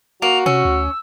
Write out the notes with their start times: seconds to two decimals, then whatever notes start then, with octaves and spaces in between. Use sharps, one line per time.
0.22 A#3 F#4 F7
0.46 C3 C#4 E6
0.65 D2